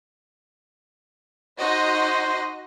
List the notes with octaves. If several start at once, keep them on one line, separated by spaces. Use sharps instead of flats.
D#4 F#4 C5 D#5 C6